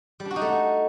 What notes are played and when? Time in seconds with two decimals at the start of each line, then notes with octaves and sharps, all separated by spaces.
0.20 G3
0.25 D4
0.31 F#4
0.36 D#4
0.41 A3